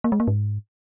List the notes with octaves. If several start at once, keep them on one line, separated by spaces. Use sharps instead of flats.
A#3
G#3
A#3
G#2